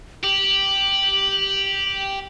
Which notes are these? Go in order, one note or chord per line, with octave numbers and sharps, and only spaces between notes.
G4 F#7